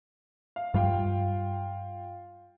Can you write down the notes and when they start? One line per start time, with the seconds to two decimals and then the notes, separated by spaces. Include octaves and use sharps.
0.56 F5
0.74 G2 G3 F4 F5 G5